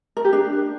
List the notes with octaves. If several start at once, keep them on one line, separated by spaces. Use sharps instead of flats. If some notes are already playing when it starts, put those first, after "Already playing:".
A#4
G4
D4